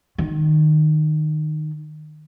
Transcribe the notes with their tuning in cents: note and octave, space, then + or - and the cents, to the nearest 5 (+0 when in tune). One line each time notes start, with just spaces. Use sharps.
D#3 -20